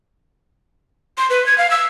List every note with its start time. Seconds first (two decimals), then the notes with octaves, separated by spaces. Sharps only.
1.18 C6
1.30 B4
1.46 G#6
1.58 F5
1.71 E6